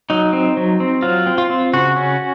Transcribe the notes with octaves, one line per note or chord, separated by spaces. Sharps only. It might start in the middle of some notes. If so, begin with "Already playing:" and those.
F#3 D#4
C4
F#3
C4
F#3 F4
C4
F4
C4
C#3 F#4
C#4